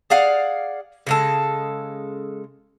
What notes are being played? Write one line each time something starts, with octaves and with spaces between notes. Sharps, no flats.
G#4 D5 F5 F#5
C#3 G#3 A4